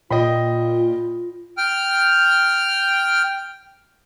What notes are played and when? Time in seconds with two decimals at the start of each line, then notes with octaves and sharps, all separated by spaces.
0.10 A#2 F4 D#5 G5 B5
1.58 G5 F6